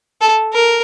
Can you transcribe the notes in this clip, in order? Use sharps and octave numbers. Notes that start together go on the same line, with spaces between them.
A4
A#4